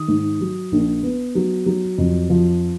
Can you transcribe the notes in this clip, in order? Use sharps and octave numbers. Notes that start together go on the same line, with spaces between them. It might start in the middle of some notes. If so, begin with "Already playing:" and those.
Already playing: D#3 D#6
G#2
F#3
A#1
B3
F#3
F#3
F2
F3